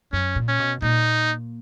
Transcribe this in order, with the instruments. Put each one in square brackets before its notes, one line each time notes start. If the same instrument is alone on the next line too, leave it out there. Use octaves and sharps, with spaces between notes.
[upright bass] F#2 [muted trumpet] C#4
[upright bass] A#2
[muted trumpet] C#4
[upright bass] B2
[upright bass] A#2 [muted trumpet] D#4